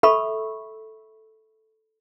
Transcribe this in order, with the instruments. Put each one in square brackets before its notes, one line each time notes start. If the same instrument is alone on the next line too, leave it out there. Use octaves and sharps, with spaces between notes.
[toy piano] A4 B5 C#6 [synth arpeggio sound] E5